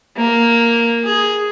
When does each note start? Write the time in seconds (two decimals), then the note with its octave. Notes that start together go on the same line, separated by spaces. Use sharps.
0.16 A#3
1.04 G#4